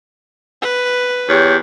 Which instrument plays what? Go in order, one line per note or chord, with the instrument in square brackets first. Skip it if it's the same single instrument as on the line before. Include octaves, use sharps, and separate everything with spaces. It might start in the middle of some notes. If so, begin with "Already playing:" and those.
[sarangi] B4
[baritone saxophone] E2 [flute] G4 [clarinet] C#5